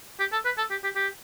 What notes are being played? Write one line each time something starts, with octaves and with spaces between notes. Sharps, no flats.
G4
A4
B4
A4
G4
G4
G4